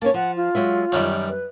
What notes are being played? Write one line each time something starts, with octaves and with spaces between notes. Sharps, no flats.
A#3 C#4 C#5 A5
F3 F#5
F4
F#3 G#3 E5
F#2 D#3 G3 C#5
B4